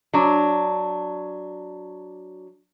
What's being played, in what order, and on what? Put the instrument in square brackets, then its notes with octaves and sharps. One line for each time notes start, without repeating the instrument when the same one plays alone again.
[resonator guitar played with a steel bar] F#3 D4